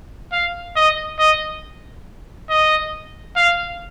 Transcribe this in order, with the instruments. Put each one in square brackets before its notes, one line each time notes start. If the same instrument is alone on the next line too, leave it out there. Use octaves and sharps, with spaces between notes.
[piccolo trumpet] F5
D#5
D#5
D#5
F5